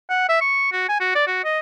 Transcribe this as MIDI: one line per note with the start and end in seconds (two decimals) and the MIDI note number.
0.10 0.26 78
0.29 0.39 76
0.41 0.69 85
0.72 0.85 66
0.89 0.98 80
1.00 1.10 66
1.15 1.26 74
1.27 1.42 66
1.44 1.59 75